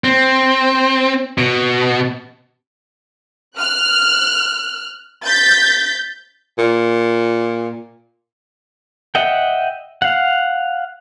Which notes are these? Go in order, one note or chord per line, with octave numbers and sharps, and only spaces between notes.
C4
B2
F6 F#6
G6 A6 B6
A#2
D#5 E5 F#5 G5
F5 F#5